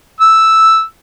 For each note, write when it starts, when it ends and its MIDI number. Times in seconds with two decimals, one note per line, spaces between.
0.21 0.83 88